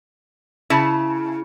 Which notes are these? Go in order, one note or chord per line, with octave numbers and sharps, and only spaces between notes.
C#3 E4 E5 A5 B5